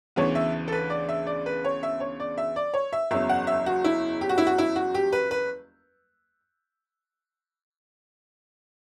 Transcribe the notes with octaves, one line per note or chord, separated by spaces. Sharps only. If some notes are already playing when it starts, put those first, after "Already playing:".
D2 C#3 E3 B3 C#5
E5
A4
B4
D5
E5
D5
B4
C#5
E5
C#5
D5
E5
D5
C#5
E5
F#1 E2 C#3 F#3 E5
F#5
E5
F#4
E4
G4
F#4
E4
F#4
E4
F#4
G4
B4
B4